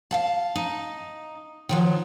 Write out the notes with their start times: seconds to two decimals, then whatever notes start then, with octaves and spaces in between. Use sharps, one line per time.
0.11 F5 F#5 A5
0.56 D#4
1.69 D#3 F3 F#3